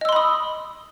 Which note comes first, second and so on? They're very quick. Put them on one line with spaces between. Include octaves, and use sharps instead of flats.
D#5 E6 C6 B5 D#6